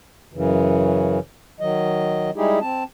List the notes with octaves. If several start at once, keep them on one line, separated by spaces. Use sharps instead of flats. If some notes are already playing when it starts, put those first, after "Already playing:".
F#2 C#3 E3
D#3 F#3 D#5
G3 G#3 D#4 E4 G4 G#4
C4 A5